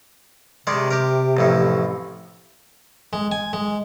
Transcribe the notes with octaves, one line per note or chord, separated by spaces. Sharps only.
C3 D#3 G#3 D4
G4 A#4
A1 F2 A2
G#3
G#5
G#3